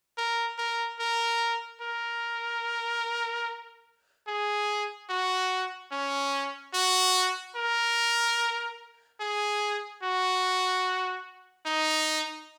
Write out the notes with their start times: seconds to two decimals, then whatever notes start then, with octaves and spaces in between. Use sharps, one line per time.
0.18 A#4
0.58 A#4
0.99 A#4
1.81 A#4
4.28 G#4
5.10 F#4
5.92 C#4
6.74 F#4
7.56 A#4
9.20 G#4
10.03 F#4
11.66 D#4